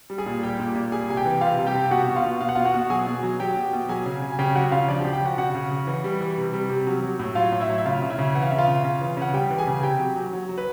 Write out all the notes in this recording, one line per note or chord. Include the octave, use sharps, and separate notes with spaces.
G3
G#4 G#5
A#2
G3 G4 G5
A#2
A#2
G3 G#4 G#5
C3 G#5
G4 G5
E3
C3 F4 F5
G3
G4 G5
C3
B2 F#4 F#5
B2
F4 F5
B2
B2 F5
F#5
B2 F4 F5
F#4 F#5
B2
F#3 G#4 G#5
B2
F#3
F#3 G4 G5
B2
B2
F#3 G#4 G#5
C#3
C#3
G#5
C#3 G4 G5
F#3 F#4 F#5
C#3 F4 F5
F3 D4 D5
G4 G5
C#3
G4 G5
F3 F#4 F#5
C#3 F#4 F#5
C#3
C#3
E3
G3
E3
C3
G3
C3
F#3
F#3
A2
F#3 F4 F5
A2
E4 E5
F#3
E5
C#3 F4 F5
C#3
E4 E5
C#3
E3 F#5
F5
C#3 E5
F4 F5
C#3
C#3
E3
C#3 F#5
G3 G4 G5
E3
G#4 G#5
C#3
C3 G4 G5
F#3
F#3
F#3
F#3
B4